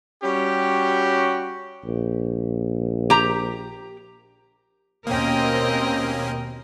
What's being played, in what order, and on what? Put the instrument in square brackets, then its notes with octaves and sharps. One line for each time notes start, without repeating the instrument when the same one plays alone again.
[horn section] G3 C#4 F#4 G4
[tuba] A#1
[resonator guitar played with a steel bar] G4 A#5
[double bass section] D#2 B2 [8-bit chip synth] A#3 C#4 [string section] C4 G5 [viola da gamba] A#4 D#5